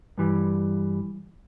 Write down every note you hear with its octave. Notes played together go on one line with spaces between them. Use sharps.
G2 E3 G3